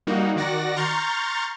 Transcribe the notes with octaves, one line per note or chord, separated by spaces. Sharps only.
G3 A#3 D#4 F#4
D#3 F#4 D5 F#5 A#6
A#5 C6 C#6 F6 G6 A6